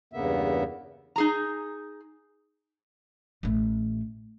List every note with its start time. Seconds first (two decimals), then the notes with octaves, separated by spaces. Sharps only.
0.13 E2 G2 C#3 A#3 B3 E5
1.16 D#4 G#4 A#5
3.43 A1 A3